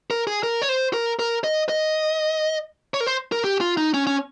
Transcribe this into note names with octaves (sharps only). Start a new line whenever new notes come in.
A#4
G#4
A#4
C#5
C5
A#4
A#4
D#5
D#5
C#5
A#4
C5
A#4
G4
F4
D#4
C#4
C#4